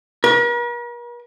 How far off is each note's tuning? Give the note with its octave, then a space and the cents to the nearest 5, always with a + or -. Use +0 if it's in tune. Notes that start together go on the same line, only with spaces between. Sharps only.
A#4 +45